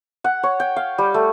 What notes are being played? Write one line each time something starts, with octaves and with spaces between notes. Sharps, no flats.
F#5
C#5
G5
F5
G3
A3